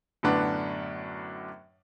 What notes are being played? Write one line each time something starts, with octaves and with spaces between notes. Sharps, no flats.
F#2 A2 D3 B3 D4